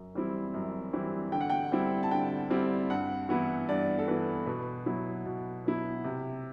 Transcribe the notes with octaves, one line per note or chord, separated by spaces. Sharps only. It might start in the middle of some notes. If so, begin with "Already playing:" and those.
Already playing: F#2
E3 G3 C4 E4
F#2
E3 G3 C4 E4
D3 G5
F#5
G5
G3 C4 E4
A5
D3 G5
G3 C4 E4
G2 F#5
E3 B3 E4
G2 D5
A4
E3 B3 E4 B4
B2 B4
F#3 B3 E4
B2
F#3 B3 E4
C3